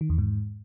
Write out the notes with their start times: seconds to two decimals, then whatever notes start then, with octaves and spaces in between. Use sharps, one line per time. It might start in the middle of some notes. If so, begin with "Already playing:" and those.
0.01 D#3
0.10 E2
0.18 G#2